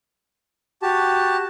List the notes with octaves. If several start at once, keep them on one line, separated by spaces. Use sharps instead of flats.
F#4 G4 A5